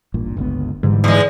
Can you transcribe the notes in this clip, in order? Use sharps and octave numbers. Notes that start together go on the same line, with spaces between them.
A1 G2 A#2
G1 C#2 B3
G#2 D3 E3 G3
E2 G#3